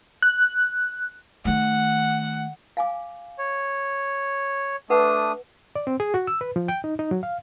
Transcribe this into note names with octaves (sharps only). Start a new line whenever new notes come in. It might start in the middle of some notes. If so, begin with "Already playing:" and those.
F#6
D#3 A3 F#5
F5 G#5 D6
C#5
A3 D4 B4 F#5 D#6
D5
C4
G#4
F#4
E6
B4
F3
G5
D#4
D#4
F#3
F5